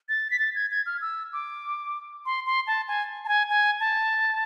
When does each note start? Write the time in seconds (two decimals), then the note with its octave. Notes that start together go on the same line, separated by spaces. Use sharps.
0.09 A6
0.31 B6
0.39 A6
0.56 G#6
0.71 G#6
0.86 F6
1.01 E6
1.33 D6
2.26 C6
2.46 C6
2.67 A5
2.88 G#5
3.25 A5
3.28 G#5
3.49 G#5
3.80 A5